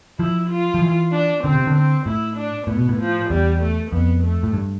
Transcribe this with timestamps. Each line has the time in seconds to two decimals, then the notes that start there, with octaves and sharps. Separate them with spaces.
0.19 F3 E4
0.50 F4
0.74 F3
0.82 E3
1.12 D4
1.44 D3 C4
1.55 C3
1.67 D3
1.75 C4
2.06 A2 E4
2.37 D4
2.67 A2 B3
2.78 B2
2.89 A2
2.99 F3
3.30 E2 G3
3.61 A3
3.91 F2 B3
4.23 A3
4.43 A2
4.54 G2